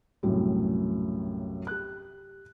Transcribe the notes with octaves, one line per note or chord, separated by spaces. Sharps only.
B1 F#2 A2 C3 F#3 G3
G4 F#6